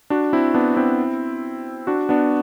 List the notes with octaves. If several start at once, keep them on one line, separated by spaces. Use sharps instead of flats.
D4 F#4
C4 E4
B3 D4
C4 E4
D4 F#4
B3 D4